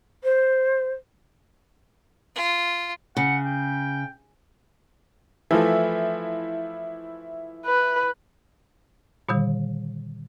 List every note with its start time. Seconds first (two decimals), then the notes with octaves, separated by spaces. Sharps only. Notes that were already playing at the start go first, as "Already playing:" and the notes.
0.23 C5
2.35 F4
3.17 C#3 F#5
3.45 G5
5.51 E3 F3 A3 E4
7.65 B4
9.29 A#2 D3 D#3 G3